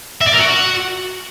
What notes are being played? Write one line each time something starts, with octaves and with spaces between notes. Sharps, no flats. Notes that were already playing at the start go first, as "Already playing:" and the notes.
E5
D5
A#4
F#4